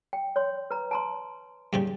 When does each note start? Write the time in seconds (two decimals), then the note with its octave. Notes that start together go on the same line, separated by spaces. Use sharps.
0.13 G5
0.36 C#5 C6
0.71 B4 A#5
0.91 A5 A#5 C6
1.73 G#2 C#3 G3